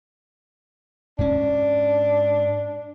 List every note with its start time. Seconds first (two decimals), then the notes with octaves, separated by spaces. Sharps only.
1.19 G#2 C#4 D4